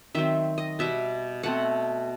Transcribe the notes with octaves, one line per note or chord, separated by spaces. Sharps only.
D#3 F#3 C4 E5
D#5
B2 G3 B3 E5
B2 A3 C4 F#5